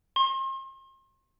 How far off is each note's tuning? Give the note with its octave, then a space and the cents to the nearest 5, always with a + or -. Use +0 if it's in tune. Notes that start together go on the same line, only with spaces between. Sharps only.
C6 +40